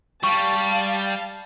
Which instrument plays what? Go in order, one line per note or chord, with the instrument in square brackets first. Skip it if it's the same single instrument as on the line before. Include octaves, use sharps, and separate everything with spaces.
[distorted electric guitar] G3 [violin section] F5 A5 [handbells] C#6